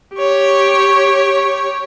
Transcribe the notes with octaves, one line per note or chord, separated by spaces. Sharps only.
G4 C#5